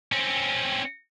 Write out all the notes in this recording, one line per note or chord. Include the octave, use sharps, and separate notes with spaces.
C4 C#4